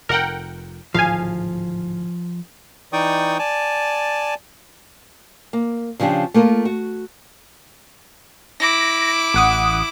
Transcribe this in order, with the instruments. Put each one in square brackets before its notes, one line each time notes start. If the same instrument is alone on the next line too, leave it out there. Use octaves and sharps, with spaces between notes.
[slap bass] F1 [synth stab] A#4 F#5 G5
[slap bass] D1 G#1 [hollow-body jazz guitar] F3 [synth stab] F5 G#5
[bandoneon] E3 D#4 D5 G5 C#6 D#6
D5 G#5 A5
[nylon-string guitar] A#3
C#3 F3 D4 G4
A3 A#3 F4 A#4
F#4
[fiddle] E4 D6 [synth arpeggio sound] A#6
[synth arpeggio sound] A1 F#5 D#6